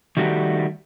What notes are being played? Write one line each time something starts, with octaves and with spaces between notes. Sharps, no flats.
D#3 G3 A3 F#4 G4